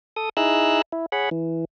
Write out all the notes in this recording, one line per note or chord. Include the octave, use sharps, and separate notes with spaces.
A4 D#6
D#4 E4 G#4 A#5 E6 F#6
E4
G#4 C#5 F#5 B5
E3